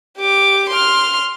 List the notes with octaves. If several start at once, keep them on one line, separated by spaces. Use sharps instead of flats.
G4 D6
C6 F6